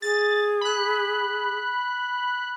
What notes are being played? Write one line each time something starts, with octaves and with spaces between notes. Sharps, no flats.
G#4 A6
B5 F#6